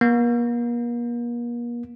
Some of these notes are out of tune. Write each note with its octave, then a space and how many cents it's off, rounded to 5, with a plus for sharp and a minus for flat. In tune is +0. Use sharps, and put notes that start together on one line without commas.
A#3 +40